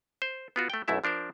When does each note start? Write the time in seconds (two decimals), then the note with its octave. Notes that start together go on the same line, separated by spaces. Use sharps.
0.22 C5
0.56 B3 F4 F#4
0.70 A3 G5
0.88 B1 F#2 A3 E4 E5
1.04 F3 D4 A#4 C5